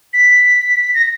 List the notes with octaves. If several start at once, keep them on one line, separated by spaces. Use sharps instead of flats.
B6
A#6